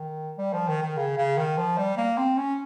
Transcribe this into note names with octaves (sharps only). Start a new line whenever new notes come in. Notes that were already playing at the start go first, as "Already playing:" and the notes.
Already playing: D#3
G3
F3
D#3
D#3
C#3
C#3
D#3
F3
G3
A#3
C4
C#4